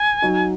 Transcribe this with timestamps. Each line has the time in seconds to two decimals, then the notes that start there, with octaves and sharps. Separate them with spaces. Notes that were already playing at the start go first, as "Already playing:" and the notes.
Already playing: G#5
0.22 F#3 D#4 F#4